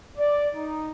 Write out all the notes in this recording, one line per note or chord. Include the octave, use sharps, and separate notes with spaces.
D5
D#4